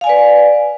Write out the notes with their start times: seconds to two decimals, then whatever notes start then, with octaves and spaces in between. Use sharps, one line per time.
0.01 F5
0.04 G#5
0.07 D5
0.09 B4